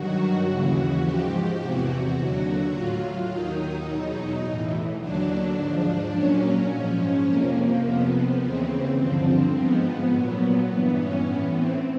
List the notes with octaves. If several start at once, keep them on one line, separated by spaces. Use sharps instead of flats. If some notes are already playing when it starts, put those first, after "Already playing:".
Already playing: G2 D#3 F#3 F#4
D#2 C#3 E3
G#2 F3 G4
E2 C3 E3 F#4
D#2 D3 F#3
A2 F#3 F4
D#2 D#3 F#3 D#4
E2 B2 F#3
A2 E3
D#2 D3 F#3 D4
G#2 F3
A#2 F#3 C#4
G#2 F3
F2 C3 F3 A#3
F2 C3 F3 B3
D#2 C#3 E3 C4
G2 D3 F3
G#2 F3 B3
A#2 F#3
G2 E3 B3
C#4
A2 E3 B3
C4